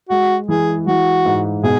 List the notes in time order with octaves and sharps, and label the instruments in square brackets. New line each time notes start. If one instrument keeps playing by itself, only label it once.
[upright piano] G#3 [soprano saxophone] F#4
[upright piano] E3 [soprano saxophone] G#4
[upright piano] E3 [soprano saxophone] F#4
[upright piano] G#2
[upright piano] B2 [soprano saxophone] G#4